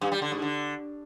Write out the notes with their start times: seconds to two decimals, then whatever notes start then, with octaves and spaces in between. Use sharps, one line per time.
0.01 G2
0.12 G3
0.22 D3
0.32 G#2
0.42 D3